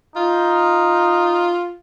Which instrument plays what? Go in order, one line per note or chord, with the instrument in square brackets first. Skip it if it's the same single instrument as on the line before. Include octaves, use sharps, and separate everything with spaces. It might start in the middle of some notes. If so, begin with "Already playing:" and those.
[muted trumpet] D#4 [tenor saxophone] F4